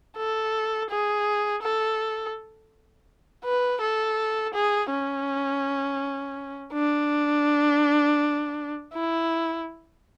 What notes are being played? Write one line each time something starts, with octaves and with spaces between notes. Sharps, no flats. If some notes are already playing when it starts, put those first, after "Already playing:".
A4
G#4
A4
B4
A4
G#4
C#4
D4
E4